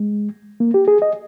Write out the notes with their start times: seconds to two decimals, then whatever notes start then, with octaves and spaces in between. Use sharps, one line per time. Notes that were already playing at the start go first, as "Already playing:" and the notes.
Already playing: G#3
0.60 A#3
0.74 G4
0.88 G#4
1.02 D#5